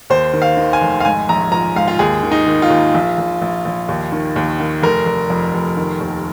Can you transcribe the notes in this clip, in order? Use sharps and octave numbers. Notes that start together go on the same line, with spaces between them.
D#2 C5
D#3
F5
D#3
G#5
F1
F5
G#2 G#5
A#1 A#5
F3 A#5
G#2 F5
F4
D#2 G#4
D#3
D#4
D#3
F4
D#2
A#1
A#1
A#1
A#1
D#2
D#3
D#2
D#3
F1 A#4
F1
F2
F1
D#3
D#2